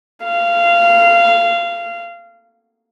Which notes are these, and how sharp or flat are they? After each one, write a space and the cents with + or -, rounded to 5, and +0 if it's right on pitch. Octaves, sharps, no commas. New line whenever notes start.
F5 -20